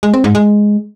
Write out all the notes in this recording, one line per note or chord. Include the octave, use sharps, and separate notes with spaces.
G#3
C4
G#2
G#3